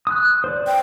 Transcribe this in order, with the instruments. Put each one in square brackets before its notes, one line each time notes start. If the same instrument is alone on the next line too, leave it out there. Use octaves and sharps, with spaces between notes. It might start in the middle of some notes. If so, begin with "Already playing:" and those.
[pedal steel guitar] D#6 F#6
C5 D5
[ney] G5